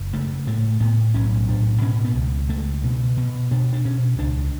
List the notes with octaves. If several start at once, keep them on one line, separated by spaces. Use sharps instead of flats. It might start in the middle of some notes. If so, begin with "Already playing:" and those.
Already playing: F#1
C#3 A3
A2 A3
A2 B3
B1 C#4
A2 D4
B2 C#4
B3
C#2
C#2 A3
B2
B2
B2 D4
D4
B2 C#4
C#2 D4